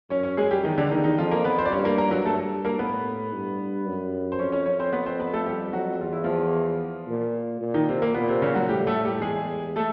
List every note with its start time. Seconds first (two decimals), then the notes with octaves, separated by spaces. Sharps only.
0.10 F#2 C#4 C#5
0.23 C#4 C#5
0.37 G#3 G#4
0.51 G3 G4
0.64 E2 D#3 D#4
0.78 D3 D4
0.91 D#3 D#4
1.04 D#3 D#4
1.17 F2 F3 F4
1.31 A#3 A#4
1.44 B3 B4
1.58 C4 C5
1.65 D5
1.71 G2 C#4 C#5
1.85 A#3 A#4
1.98 A#3 A#4
2.11 F#3 F#4
2.25 G2 A3 A4
2.65 A#3 A#4
2.79 A2 B3 B4
3.32 G2
3.86 F#2
4.32 C5
4.39 F2 C#4 C#5
4.52 C#4 C#5
4.66 C#4 C#5
4.79 C4 C5
4.93 B3 B4
5.06 C4 C5
5.19 B3 B4
5.34 A3 A4
5.46 G3 G4
5.73 F#3 F#4
6.00 E2 F4
6.12 E4
6.24 F3 F4
7.08 A#2
7.61 A#2
7.74 D#3 D#4
7.88 C3 C4
8.02 A#3
8.14 A#2 B3
8.28 C3 C4
8.42 C#3 C#4
8.55 F#3 F#4
8.68 A2 G3 G4
8.87 A3 A4
9.04 G3 G4
9.22 E2 G#3 G#4
9.76 A3 A4